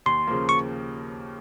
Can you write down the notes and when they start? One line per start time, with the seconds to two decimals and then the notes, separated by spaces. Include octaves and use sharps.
0.06 D#2 C6
0.27 C#3 F3 A#3
0.49 C#6